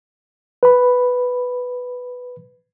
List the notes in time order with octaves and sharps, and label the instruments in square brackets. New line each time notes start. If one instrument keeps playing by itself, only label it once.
[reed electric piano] B4 B5